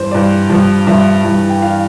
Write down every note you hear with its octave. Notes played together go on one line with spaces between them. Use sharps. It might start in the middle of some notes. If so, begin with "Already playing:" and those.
Already playing: G2 E3 C5
G2 E3 D5
G2 F3
G2 F3 E5
G2 E3
G5
E3 F5